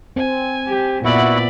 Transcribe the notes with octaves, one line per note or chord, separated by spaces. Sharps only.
C4 G#5
G4
A#2 B3 E4 F#4 D5 E5 B5